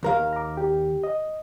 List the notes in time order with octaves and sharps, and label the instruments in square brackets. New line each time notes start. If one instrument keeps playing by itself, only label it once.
[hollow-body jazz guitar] D#2 A#4 F5
[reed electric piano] A#5 D6
G4
D#5